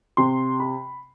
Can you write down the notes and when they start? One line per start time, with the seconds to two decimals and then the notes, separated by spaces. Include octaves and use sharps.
0.17 C3 C6
0.60 B5